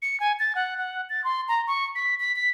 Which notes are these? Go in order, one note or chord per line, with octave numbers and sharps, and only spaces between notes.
C#7
G#5
A6
F#5
F#5
A6
C6
A#5
C#6
B6
B6
B6